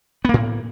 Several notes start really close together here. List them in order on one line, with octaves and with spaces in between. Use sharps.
B3 A#3 A2